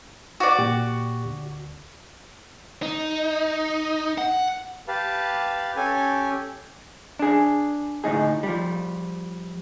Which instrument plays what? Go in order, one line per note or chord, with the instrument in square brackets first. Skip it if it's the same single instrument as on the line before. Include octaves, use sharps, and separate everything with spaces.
[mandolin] F#4 D5
[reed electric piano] A#2 G4
D2
[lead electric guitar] D#4
F#5
[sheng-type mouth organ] G4 B4 F5 A5
C#4 G4 A4 G#5
[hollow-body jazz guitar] D4 G#4
D2 A2 D#4 G#4
F3 G3